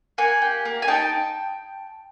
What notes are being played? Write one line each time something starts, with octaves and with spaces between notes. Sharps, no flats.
A#3 F#5 G#5
G4
A#3
G#5
D#4 G5 A5